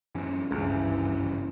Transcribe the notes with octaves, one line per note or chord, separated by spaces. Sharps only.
F#2 E3 C#4
G#1 C#2 G2 C#3 E3